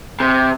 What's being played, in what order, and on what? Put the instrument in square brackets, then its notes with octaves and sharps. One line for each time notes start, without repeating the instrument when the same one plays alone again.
[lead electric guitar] C3